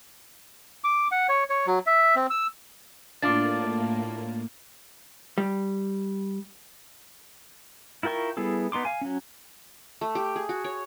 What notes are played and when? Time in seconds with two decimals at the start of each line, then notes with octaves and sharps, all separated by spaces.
0.84 D6
1.11 F#5
1.29 C#5
1.50 C#5
1.66 F#3
1.86 E5
2.16 C4
2.30 E6
3.22 A2 A#3 D4 F4 D6 A6
5.38 G3
8.03 E4 F4 A#4 G5 C#6
8.37 G3 B3 E4 G#4 A4
8.72 B3 D#4 C6 D6
8.85 F5 G#5
9.01 F#3 C#4
10.01 A3
10.15 G4
10.36 G#4
10.49 F#4
10.64 C#5